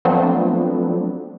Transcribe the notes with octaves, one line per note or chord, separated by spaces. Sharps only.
F3 F#3 A3 B3 C4 D4